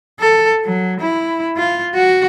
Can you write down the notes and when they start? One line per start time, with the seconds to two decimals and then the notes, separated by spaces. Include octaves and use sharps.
0.20 A4
0.64 F#3
1.00 E4
1.57 F4
1.94 F#4